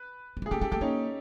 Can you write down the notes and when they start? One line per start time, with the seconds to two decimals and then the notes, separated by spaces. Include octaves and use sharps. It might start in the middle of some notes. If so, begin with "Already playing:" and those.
Already playing: B4
0.37 G3
0.42 G#3
0.46 G#4
0.51 A3 G4 A4
0.61 G#3 G4 A4
0.72 A3 G4 A4
0.81 A#3 C#4 D#4